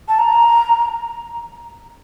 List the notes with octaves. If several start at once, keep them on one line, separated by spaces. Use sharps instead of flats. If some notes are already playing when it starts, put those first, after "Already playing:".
A5
A#5